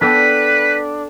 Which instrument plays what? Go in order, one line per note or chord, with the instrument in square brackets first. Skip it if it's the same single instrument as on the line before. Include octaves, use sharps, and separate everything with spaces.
[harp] B3 A4 G5 [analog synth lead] D4 [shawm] B4 [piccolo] B6